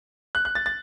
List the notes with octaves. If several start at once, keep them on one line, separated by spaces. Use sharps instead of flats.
F#6
F#6
A6
A6